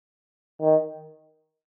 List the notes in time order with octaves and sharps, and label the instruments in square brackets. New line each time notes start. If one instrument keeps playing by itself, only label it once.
[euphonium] D#3